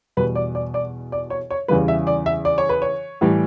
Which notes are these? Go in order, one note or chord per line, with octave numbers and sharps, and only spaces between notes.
E2 B2 G3 B4
D5
D5
D5
D5
C#5
C#5
E2 C#3 E3 G3 B4
E5
D5
E5
D5
C#5
B4
C#5
A2 E3 G3